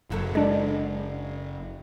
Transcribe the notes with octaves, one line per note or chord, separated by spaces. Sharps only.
F#1 C3 F#3 A4
G#3 D4 D5